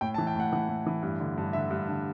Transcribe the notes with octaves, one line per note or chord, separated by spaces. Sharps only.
A2 G5
A5
E3
G5
A2 F#5
E3 F#5
A2
E3
G2
D3
G2
D3 E5
G2
D3